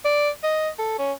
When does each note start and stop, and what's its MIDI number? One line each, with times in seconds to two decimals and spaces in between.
0.05 0.29 74
0.43 0.69 75
0.79 0.97 69
0.99 1.12 61